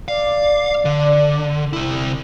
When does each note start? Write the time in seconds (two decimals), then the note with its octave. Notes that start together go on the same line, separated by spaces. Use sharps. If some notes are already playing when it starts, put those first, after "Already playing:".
0.08 D5 F5
0.85 D3
1.73 C3 E4